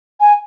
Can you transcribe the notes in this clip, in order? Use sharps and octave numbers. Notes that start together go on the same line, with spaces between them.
G#5